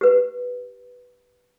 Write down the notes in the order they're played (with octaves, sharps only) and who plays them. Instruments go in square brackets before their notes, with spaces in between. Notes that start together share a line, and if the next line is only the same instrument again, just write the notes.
[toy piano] G4 B4